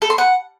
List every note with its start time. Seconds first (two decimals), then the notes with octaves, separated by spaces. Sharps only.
0.02 A4
0.10 C6
0.18 F#5